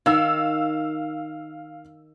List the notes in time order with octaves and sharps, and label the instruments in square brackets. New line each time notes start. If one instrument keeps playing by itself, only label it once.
[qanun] D#3 [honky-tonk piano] F5 E6